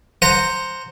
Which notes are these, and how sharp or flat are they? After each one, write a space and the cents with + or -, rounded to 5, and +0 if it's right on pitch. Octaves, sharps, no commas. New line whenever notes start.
C5 +0 F#5 +0 A#5 -15